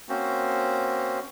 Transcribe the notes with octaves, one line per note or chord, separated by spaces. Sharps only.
A#3 C4 C#4 F#4 C5